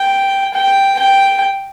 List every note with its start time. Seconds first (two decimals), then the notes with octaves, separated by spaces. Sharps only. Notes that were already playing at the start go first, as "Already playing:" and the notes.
Already playing: G5
0.54 G5
0.99 G5